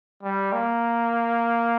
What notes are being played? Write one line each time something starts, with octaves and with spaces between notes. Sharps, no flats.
G3
A#3